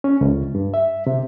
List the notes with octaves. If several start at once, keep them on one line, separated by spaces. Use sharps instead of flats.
C#4
C#2
G2
E5
C3